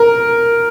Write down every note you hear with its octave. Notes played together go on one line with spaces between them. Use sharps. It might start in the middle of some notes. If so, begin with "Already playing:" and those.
Already playing: A#4